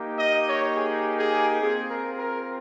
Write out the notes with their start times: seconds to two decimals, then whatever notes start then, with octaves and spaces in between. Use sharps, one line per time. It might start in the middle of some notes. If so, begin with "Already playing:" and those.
Already playing: A#3 D#4 G4
0.18 D#5
0.48 C#5
0.75 G#4
1.18 G#4
1.61 C4 F4 G#4
1.89 A#4
2.18 A#4